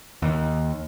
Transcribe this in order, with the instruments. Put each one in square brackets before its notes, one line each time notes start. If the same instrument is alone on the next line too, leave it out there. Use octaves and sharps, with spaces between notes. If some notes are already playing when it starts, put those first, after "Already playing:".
[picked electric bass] D#2